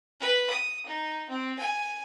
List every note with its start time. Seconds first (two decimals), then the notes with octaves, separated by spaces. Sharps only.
0.20 B4
0.49 D#6
0.86 D#4
1.29 C4
1.59 G#5